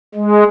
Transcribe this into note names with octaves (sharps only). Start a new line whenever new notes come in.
G#3